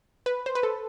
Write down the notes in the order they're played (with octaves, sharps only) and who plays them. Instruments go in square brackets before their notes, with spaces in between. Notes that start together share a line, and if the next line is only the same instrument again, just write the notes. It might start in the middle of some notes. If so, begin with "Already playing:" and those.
[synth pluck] B4
C5
B4
A4